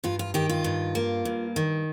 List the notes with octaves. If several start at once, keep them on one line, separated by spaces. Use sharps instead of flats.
G2 F4
F4
D#3 G4
F4
G2
A#3
G2
D#3